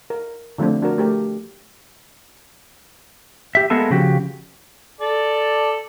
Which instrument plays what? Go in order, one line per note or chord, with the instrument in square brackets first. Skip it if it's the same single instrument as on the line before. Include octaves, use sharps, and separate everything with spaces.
[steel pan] A#4
D3 F3 A3 C4 D4
D4 F#4 A#4
A3 G4 A#4
[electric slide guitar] G4 E5
G#3 A#3 B3 A4 E5 A5
C#3 F3 F#4 G4
[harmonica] A4 D5